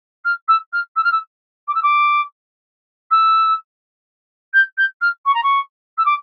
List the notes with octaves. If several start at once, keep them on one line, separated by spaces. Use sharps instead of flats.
F6
E6
F6
E6
F6
E6
D6
E6
D6
E6
G6
G6
F6
C#6
A#5
C#6
E6
D6